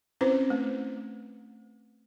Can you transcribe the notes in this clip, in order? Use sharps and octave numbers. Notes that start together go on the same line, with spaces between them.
C4 C#4 E4 B4 C5
A3